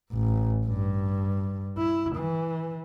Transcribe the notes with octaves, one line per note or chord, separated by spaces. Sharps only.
A1
G2
E4
E3